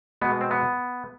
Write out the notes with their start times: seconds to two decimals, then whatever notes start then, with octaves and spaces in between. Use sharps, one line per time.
0.21 B2 G#3 B3
0.41 C4
0.51 B3